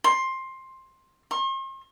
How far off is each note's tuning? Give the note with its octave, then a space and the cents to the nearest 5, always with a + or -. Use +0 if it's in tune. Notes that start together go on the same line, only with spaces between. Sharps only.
C6 +15
C6 +45